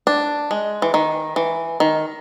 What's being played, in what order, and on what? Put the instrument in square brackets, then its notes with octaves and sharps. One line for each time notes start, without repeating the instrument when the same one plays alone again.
[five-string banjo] D4
G#3
E3
D#3
E3
D#3